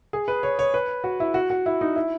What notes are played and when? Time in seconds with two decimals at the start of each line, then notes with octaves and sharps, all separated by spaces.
0.13 G#4
0.28 B4
0.43 C#5
0.59 C#5
0.74 B4
1.04 F#4
1.20 E4
1.34 F#4
1.50 F#4
1.66 E4
1.81 D#4
1.96 E4